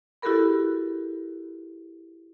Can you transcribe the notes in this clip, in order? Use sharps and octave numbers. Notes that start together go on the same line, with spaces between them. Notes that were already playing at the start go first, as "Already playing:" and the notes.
E4 F#4 G4 A4 A#4 B5